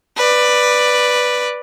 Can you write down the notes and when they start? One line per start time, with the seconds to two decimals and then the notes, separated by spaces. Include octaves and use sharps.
0.17 B4 D5